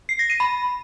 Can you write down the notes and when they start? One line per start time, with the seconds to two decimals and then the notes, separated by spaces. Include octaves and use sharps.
0.09 C7
0.19 A#6
0.30 D#7
0.40 B5